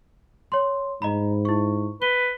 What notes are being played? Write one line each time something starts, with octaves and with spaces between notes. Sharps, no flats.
C#5 C6
G#2 D#5 A#5 B5
E4 C#6
B4 G7